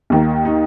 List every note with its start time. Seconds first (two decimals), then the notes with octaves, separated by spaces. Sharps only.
0.10 D#2 D#3 A#3
0.45 D#4